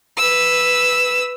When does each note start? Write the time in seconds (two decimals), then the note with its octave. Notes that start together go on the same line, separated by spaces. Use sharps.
0.17 B4 E6